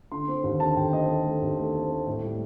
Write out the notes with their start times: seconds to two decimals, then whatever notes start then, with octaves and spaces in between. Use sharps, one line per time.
0.12 D3 C6
0.28 C4
0.44 D#2
0.60 D3 A5
0.77 D#2 G5
0.93 C4 D#5
1.09 C4
1.25 A3
1.42 D#2
1.58 A3
1.75 C4
1.91 C4
2.06 A2
2.23 G3